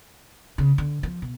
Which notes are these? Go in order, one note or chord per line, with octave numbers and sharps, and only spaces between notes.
C#3
D3
F3
B2